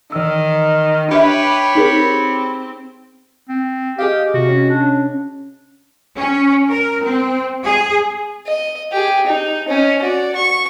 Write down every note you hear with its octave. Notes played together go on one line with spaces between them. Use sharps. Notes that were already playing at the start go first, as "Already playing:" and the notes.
D#3 E3 E6
D4 G4 B4 C#5 E5 B5
C4 D#4 G#4 A#4
C4
G4 G#4 D#5 F5
C3 F#4
C#4
D4
C#4
A#4
C4
G#4
D#5
G4 G#4
D#4
C#4 D#5
F#4 D5
C#6